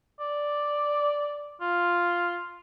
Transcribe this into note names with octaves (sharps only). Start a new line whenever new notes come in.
D5
F4